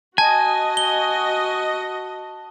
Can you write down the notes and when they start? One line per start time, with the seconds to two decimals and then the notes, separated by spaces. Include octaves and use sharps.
0.18 F#4 D#5 G#5 A5
0.77 G7